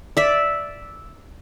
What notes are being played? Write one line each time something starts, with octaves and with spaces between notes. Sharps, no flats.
D5 E5